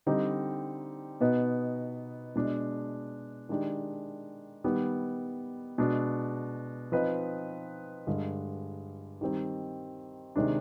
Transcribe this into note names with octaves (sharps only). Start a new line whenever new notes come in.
D3 G3 C4 D#4
B2 B3 D#4 B4 D#5
B2 G#3 D4
D#3 G#3 D4 G4
D#3 G3 B3
B2 G#3 D4
F3 C4 D#4 B4 D#5
G2 D3 G#3
D#3 G3 C4
C3 D#3 G#3 D4